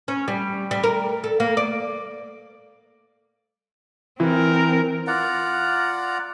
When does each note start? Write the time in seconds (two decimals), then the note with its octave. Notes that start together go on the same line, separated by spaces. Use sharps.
0.08 C#4
0.28 G3
0.71 G3
0.84 A#4
1.24 A4
1.40 A#3
1.57 D5
4.20 E3 C4 A#4
5.07 F4 D5 F#5 A#5